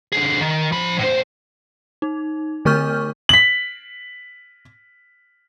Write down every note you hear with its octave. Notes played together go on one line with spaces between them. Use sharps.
D3 G#4
D#3
F3 B5
A2 C5
D#4
D3 A3 A#4 C#6 F6 G6
B6 F#7